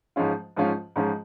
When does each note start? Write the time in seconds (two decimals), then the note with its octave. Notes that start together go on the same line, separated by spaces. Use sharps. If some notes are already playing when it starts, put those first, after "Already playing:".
0.16 G#2 F3 G#3 C#4 F4
0.56 G#2 F3 G#3 C#4 F4
0.96 G#2 F3 G#3 C#4 F4